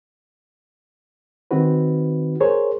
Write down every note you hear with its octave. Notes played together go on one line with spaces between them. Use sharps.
D#3 C4 D#4 F#4 B4
G#4 A#4 C5 C#5